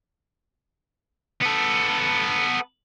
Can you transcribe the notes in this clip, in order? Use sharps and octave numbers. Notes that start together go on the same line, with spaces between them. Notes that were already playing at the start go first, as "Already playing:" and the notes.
B3 A4